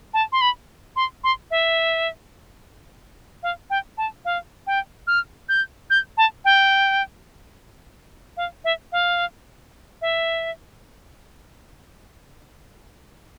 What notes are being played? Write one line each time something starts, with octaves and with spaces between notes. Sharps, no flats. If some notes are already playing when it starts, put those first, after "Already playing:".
A5
C6
B5
C6
C6
E5
F5
G5
A5
F5
G5
F6
G6
G6
A5
G5
F5
E5
F5
E5